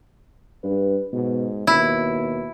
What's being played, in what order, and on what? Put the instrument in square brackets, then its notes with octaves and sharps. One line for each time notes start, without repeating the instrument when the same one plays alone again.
[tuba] G2 [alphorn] B4
[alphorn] G#2 [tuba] B2
[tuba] D#2 [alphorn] B2 [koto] E4